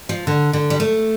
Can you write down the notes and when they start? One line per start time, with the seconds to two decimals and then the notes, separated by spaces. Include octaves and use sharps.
0.09 F3
0.27 D3
0.53 D3
0.70 G3
0.80 A3